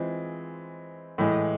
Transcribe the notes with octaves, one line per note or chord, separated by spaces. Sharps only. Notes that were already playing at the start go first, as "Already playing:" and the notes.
Already playing: E3 G#3 C4 F4
A2 E3 G#3